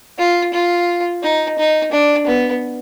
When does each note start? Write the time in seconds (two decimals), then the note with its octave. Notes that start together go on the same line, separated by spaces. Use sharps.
0.18 F4
0.53 F4
1.22 D#4
1.58 D#4
1.92 D4
2.27 B3